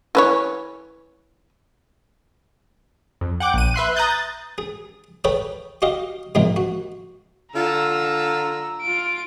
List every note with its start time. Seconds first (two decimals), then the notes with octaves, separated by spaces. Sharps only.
0.15 E3 B4 C#5
3.21 F2
3.40 F#5 G5 D6
3.54 A#1 D#7
3.74 B4 E5 C6 F#6
3.96 A#5 D#6 F#6 G6 A6
4.10 A6
4.58 G#4
5.24 G#4 A4 B4 C#5 G5
5.82 F#4 G4 D#5 F5
6.35 G#2 C3 D#3 F3 G#3 A#3
6.56 F#4
7.54 D3 F4 A#5 E6
8.81 F4 D7